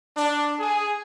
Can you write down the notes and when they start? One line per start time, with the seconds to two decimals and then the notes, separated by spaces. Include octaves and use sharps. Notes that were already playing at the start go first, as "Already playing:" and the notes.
0.16 D4
0.60 G#4